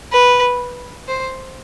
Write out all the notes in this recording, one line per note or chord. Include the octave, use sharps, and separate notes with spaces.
B4
C5